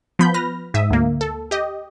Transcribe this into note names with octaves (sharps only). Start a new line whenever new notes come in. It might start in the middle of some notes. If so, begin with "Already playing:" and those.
F3 B3 B5 G6
B4 F6 A#6
G#2 E5 D#6
D2 A#3
A4
G4 D#5